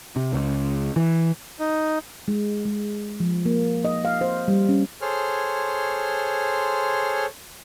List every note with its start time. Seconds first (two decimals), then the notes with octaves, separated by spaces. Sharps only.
0.16 C3
0.33 C#2
0.96 E3
1.60 D#4
2.28 G#3
2.65 G#3
3.20 F3
3.46 A#3
3.85 D#5
4.05 F5
4.21 C5
4.48 G3
4.69 C#4
5.02 G#4 A4 C5 C#5 C6 F6